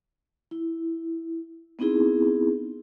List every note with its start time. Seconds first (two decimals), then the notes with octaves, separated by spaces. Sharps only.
0.51 E4
1.79 B3 C4 D#4 E4 G#4